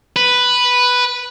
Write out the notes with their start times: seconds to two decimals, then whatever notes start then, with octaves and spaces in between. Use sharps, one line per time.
0.16 B4